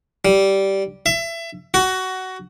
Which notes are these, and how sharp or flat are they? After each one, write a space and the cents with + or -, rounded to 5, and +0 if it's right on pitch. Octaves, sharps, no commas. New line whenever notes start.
G3 -10
E5 +25
F#4 +15